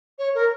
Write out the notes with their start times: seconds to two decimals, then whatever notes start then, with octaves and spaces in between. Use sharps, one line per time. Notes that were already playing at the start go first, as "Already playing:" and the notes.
0.19 C#5
0.35 A#4